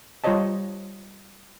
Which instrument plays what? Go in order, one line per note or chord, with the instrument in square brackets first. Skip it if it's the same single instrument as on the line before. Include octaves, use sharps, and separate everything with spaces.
[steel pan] G3 F4 C5 C#5 D#5 A5